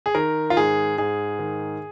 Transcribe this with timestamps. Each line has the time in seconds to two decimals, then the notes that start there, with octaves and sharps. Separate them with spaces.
0.06 G#4
0.15 D#3 A#4
0.50 F4
0.57 G#2 G#4
0.98 G#2 G#4
1.39 D#3